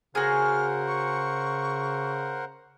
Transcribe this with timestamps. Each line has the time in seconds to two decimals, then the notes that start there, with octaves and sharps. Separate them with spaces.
0.15 C#3 F#4 G#4 A#4 C5 F#5 F6
0.87 C#6